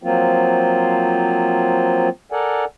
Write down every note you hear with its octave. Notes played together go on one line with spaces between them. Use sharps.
F3 F#3 A#3 C4 F4
A4 A#4 D5 F#5 G#5